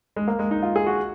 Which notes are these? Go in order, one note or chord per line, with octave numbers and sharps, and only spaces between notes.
G#3
A#3
G#3
D#4
F4
G#4
F#4